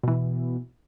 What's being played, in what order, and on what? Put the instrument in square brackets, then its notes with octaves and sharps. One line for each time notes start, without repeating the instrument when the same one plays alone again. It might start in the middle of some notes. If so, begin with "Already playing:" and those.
[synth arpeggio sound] B2 E3